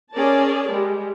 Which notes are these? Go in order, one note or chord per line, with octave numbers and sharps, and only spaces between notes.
C#4 G#4 A#4 D5 A5
G3 G#3